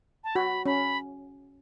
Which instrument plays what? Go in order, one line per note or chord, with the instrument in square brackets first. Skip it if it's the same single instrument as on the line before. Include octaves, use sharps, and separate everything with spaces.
[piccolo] A5
[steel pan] F#4 [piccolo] B5
[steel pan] C#4 [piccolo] B5